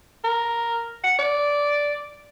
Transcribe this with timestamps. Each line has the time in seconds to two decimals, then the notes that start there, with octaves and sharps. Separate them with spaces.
0.24 A#4
1.04 F#5
1.19 D5